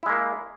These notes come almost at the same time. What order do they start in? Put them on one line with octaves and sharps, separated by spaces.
E4 G#3 A#3